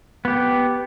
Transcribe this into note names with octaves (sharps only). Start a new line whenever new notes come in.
B3 G4